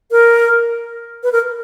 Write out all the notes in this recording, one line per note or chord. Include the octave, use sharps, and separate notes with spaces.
A#4
B4
A#4